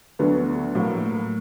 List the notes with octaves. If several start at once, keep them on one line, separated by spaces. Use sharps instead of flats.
D2 D3 F#3 B3
A2 F#3 A#3